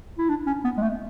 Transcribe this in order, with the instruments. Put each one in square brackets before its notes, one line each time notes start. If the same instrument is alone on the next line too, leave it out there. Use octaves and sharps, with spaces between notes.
[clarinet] E4
D4
C#4
B3
G#3
A3